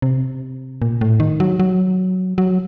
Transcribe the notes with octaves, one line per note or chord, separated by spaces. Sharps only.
C3
A#2
A2
D#3
F#3
F#3
F#3